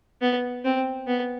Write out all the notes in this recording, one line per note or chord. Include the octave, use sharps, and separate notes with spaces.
B3
C4
B3